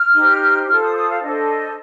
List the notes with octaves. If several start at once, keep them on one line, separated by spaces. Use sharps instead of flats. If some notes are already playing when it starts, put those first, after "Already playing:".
Already playing: F6
D#4 G4 C5
F4 A4 C5 F6
D#6
D#6
F5
D4 A4 C5 D#5